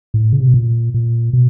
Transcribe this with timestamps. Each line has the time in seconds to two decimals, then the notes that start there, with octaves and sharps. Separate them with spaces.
0.14 A2
0.32 C#3
0.40 C3
0.47 B2
0.54 A#2
0.94 A#2
1.33 B2